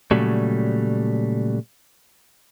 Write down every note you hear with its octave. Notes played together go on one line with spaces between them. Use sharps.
A#2 C#3 F#3 G3 A3